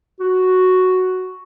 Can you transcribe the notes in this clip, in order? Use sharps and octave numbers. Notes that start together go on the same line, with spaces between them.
F#4